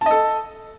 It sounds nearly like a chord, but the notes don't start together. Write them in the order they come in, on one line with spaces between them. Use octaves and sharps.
A5 D#5 A4